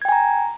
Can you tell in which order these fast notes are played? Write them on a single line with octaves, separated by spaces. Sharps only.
G#6 G5 G#5 A#5